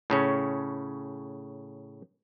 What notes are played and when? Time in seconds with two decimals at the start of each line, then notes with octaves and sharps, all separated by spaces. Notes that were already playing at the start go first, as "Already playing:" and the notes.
0.10 A2 C#3 C#4